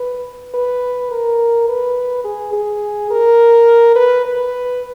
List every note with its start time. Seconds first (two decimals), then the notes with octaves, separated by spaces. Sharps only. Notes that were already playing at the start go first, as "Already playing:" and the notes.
Already playing: B4
0.54 B4
1.11 A#4
1.68 B4
2.24 G#4
2.53 G#4
3.11 A#4
3.95 B4
4.25 B4